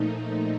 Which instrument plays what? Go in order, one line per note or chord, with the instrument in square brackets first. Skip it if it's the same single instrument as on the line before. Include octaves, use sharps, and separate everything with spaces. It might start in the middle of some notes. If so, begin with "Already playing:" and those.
Already playing: [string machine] A#2 F3 A3 D#4